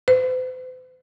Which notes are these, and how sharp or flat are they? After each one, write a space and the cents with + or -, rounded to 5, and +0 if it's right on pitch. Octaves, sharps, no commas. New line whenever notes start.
C5 -45